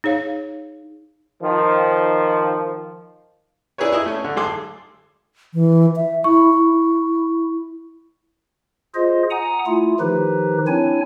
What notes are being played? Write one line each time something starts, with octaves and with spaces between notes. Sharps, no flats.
D#4 G#4 C#5 F5
D#3 F3
D4 E4 G#4 A#4 B4 C#5
E4 G#4 D#5
A3 C#4
D3
G#1 G#4 A4 C6 D6 E6
E3
E5
E4 C#6
E4
F4 G#4 C5 D#5
F#5 G#5 A#5 D#6
A3 E4 F4
D#3 F3 D#4 G4 B4
C4 D4 E4 C#5 G#5